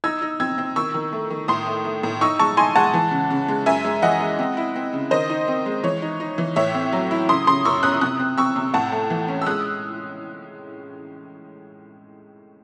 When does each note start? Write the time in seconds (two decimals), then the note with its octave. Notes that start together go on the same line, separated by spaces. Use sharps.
0.04 D#4 E6 G#6
0.22 D#4
0.40 C4 E6 G#6
0.58 C4
0.76 D#3 C#6 E6
0.94 D#3
1.13 A3
1.31 D#3
1.48 A2 C6 D#6
1.67 A3
1.85 A3
2.03 A2
2.21 D#4 C#6 E6
2.39 G#3 A5 C#6
2.57 D#4 G#5 C6
2.76 G#3 F#5 A5
2.94 E3
3.11 C#3
3.31 C#3
3.48 G#3
3.66 F#2 E5 G#5
3.85 G#3
4.02 E3 D#5 F#5
4.21 G#3
4.39 C4
4.57 E4
4.76 C4
4.93 C#3
5.11 D#3 C5 D#5
5.30 D#4
5.48 C4
5.66 G#3
5.84 E3 C#5
6.02 D#4
6.20 D#4
6.38 E3
6.56 A2 C#5 E5
6.74 C4
6.93 F#3
7.11 E4
7.29 C#3 C6 D#6
7.47 C#3 C6 D#6
7.65 F#2 C#6 E6
7.83 C#4 D#6 F#6
8.01 C3 D#6 F#6
8.20 C4
8.37 C4 C#6 E6
8.56 C3
8.74 A2 F#5 A5
8.92 A3
9.10 E3
9.28 C#4
9.42 E6
9.46 G#3 D#6 F#6